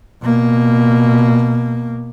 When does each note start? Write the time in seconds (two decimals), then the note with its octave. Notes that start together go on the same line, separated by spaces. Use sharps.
0.22 B2 A#3